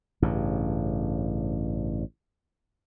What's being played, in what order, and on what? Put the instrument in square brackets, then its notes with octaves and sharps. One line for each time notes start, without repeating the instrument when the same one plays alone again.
[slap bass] A1 G2 C#3